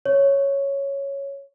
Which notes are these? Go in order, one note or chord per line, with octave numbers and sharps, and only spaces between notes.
C#5